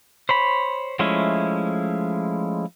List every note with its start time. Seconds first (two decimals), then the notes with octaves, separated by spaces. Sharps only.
0.29 C5 C#5 B5
0.99 F3 G#3 A3 C#4 E4